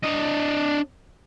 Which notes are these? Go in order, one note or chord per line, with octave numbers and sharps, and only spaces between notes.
D4 D#5